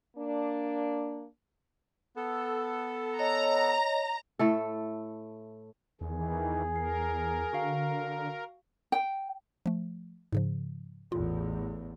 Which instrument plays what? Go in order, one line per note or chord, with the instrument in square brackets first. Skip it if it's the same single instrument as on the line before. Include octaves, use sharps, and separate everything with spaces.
[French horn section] A#3 D4
[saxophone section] B3 A4
[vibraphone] C#5 D#5 [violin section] A#5
[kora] A2 A3 A4
[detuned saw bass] E2 [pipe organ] D#3 E3 [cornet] G#4
[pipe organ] A#4 [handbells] C7
[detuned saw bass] D3 [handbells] F#4 F5 G5
[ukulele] G5
[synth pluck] F3 A3
G#2 C#3 F3
[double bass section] A1 E2 [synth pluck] F4